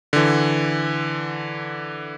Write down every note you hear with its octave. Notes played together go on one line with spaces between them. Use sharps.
D3 E3